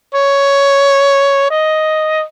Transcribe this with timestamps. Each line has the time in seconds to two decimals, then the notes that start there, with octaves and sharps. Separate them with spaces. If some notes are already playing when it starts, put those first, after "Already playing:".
0.14 C#5
1.51 D#5